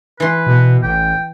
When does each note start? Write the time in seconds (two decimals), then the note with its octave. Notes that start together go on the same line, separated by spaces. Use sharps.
0.20 E3 B4 C6
0.47 B2
0.83 A1 G5